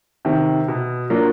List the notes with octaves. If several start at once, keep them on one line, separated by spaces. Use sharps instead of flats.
C3 D#3
B2
F#3 A#3 D4 F4